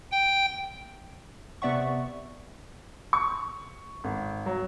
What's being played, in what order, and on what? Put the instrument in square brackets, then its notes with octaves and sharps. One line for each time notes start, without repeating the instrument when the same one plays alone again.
[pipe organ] G5
[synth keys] C3 B3 D5 E5 F#5 C#6
[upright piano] C#6
G#1
F#3